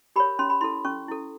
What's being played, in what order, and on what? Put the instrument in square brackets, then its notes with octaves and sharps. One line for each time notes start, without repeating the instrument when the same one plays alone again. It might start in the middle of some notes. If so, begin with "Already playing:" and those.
[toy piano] G4 A#4 C#5 B5
C#4 C6
B5
E4 A4 C6
C#4 C#6
E4 A4